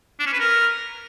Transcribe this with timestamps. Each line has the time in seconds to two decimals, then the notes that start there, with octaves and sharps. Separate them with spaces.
0.20 D4
0.26 C#4
0.33 B4
0.40 A#4